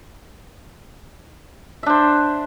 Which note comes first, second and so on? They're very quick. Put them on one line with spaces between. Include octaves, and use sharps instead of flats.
E5 D4 C5